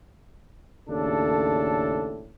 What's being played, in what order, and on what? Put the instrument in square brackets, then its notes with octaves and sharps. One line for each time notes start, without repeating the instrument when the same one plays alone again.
[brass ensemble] D#2 A2 C#3 D4 A4